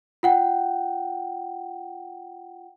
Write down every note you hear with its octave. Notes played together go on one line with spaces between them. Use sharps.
F4 F#5 G5